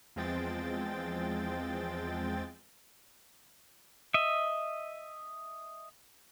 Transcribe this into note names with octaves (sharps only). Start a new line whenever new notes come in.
E2 F3 G#3 C4 G5 A6
D#5 E5